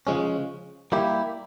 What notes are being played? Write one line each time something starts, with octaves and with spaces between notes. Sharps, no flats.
C#3 F3 G#3 C#4
G3 A#3 E4 G4